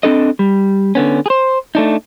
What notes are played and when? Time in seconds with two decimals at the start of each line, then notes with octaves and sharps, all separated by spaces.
0.03 C4 D4 A4 D#5
0.39 G3
0.95 D3 B3 C#4
1.26 G#4 C5
1.75 A3 D4 D#4